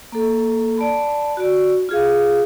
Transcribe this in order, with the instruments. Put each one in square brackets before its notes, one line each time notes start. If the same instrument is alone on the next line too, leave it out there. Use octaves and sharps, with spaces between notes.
[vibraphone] A#3 A4
D5 A5 B5
F#4 D5
F4 G#4 F5